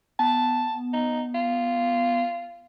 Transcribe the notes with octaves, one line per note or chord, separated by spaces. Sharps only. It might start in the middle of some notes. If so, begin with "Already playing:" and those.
B3 A5
D#4
F4